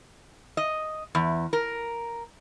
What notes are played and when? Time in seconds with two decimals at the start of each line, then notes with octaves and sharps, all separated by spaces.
0.57 D#5
1.15 E2
1.53 A#4